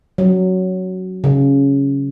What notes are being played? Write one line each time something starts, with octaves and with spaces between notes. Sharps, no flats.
F#3
C#3